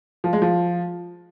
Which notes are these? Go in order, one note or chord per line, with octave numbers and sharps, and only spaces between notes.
F3
G#3
F3